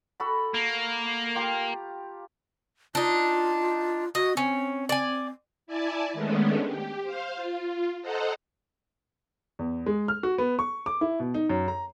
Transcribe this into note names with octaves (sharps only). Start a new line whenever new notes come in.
F#4 A4 B5
A#3
F4 G4 A#5
D4 D#4 F4
F#4 D#5
C4 C#4
D5 G#5
E4 D5 G#5 A5
D#3 G#3 A3 B3 C#4 D4
G4
C5 F5
F4
A4 C5 D#5 F#5 A#5
E2
G#3
F6
F#4
B3
C#6
D6
E4
B2
D#4
F#2
A#5